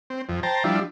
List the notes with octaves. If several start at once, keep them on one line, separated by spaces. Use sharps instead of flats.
C4
F2
C5 G5 A5 A#5
F3 G3 D4 E4